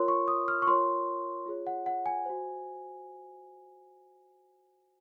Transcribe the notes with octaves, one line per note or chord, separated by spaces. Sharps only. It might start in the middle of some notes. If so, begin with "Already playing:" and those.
Already playing: F4 A#4 C#5 C6
C#6
D#6
F6
C#6
F4 A#4 C#5 C6
F4 G#4 C#5
F#5
F#5
G#5
F#4 C5